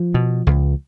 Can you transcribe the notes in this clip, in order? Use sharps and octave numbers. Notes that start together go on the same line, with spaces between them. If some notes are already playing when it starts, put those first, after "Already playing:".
Already playing: F3
B2
C#2